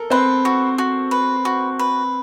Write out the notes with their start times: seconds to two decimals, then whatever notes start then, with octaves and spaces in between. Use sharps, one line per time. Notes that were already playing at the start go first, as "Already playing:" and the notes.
Already playing: A4 A#4
0.10 C4 B4 C5
0.45 F#4
0.78 F#4
1.11 B4
1.45 F#4
1.79 B4